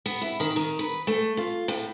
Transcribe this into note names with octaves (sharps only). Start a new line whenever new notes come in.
B3
E4
D#3
D#3
B4
A3
F4
A2